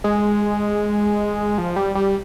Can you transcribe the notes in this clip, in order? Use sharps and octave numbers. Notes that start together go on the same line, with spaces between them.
G#3
F3
G3
G3